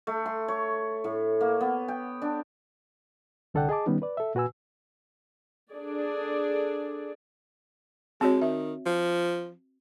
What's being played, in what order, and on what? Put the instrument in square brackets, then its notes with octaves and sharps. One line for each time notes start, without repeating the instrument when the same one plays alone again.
[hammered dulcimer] A3
C6
C#5
A2
A#3
B3
G5
D4
[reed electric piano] C2 D3 A4 D5 F#5 G5
G#4 D#5 A5 D6
D#3 G3 B3 C#4 D#4
B4 D5
A4 E5
A#2 F#4 B4 G#5 E6
[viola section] D4 G#4 A4 D5
[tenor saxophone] G#3 [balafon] C4 F#4 C#5
[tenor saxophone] D#3 [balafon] E5
[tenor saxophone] F3